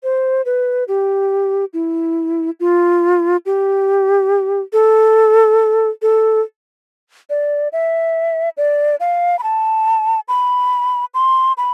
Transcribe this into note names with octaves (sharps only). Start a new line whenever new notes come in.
C5
B4
G4
E4
F4
G4
A4
A4
D5
E5
D5
F5
B5
A5
B5
C6
B5